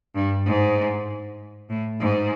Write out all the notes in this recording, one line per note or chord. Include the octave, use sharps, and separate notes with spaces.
G2
G#2
A2
G#2